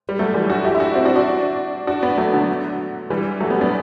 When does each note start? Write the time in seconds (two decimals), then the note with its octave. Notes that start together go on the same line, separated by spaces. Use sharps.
0.09 G3
0.19 F#3 A3
0.34 E3 G3
0.49 D4 F#4
0.65 E4 G4
0.75 E4
0.80 D4 F#4
0.95 C4 E4
1.05 D4 F#4
1.16 D4 F#4
1.87 D4 F#4
2.03 B3 D4
2.18 F#3 A3
2.33 D3 F#3
3.10 E3 G3
3.40 F#3 A3
3.50 G3 B3
3.61 B3 D4